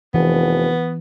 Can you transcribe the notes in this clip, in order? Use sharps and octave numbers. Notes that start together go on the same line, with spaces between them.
F1 E3 B3